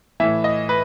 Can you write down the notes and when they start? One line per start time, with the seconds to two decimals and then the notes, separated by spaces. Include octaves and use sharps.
0.20 E3 E5
0.23 A2
0.44 D#5
0.69 B4